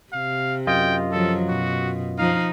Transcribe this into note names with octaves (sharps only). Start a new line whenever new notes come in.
C3 F5
F#2 F4 D#5 G5
F3 F#3 A4
B2 F#4
F3 D#4 F5